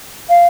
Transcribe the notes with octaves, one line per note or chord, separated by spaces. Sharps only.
F5